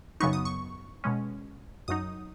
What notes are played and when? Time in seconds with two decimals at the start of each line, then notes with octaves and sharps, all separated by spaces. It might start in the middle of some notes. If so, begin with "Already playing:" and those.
0.20 F#2 C#3 F#3 B3 D#4 C#6
0.33 D#6
0.45 C#6
1.04 B2 G#3 C#4
1.88 F#2 F#3 D#4 D#6